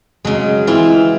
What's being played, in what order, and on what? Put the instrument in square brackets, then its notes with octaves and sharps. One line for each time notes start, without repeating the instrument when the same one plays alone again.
[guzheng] C#3 F#3 [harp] G#3
[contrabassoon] E3 [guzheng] C4 E4 F4